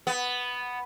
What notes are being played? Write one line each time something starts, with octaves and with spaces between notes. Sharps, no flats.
B3